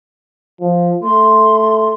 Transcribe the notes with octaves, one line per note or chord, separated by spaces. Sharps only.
F3
A3 C6